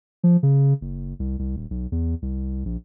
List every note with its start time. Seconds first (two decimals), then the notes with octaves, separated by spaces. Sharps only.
0.24 F3
0.43 C#3
0.81 F#1
1.19 C2
1.39 C2
1.56 D#1
1.70 B1
1.92 E2
2.22 C2
2.65 A#1